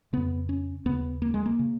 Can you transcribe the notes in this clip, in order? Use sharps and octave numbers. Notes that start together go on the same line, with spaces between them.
F2 C#3 B3
C#4
D#2 C#3 B3
A#3
G#3
A#3
C#3